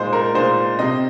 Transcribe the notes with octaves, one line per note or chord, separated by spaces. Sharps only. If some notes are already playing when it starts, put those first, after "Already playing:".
Already playing: A#2 G#3 D#4 C5
A#4
A#2 G#3 D#4 C5
C3 G3 C4 D#4 D#5